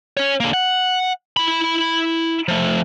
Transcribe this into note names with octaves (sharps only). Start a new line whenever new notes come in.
C#4 C#5
D3 A#3
F#5
E4 B5
F3 A3